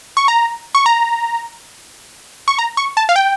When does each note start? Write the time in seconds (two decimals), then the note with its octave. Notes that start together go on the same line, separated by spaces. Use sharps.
0.17 C#6
0.28 A#5
0.75 C#6
0.86 A#5
2.48 C#6
2.58 A#5
2.77 C#6
2.97 A5
3.09 F5
3.16 G5